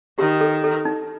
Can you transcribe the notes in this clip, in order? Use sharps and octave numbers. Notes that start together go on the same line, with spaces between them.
D#3 G4
A4
A4
D#4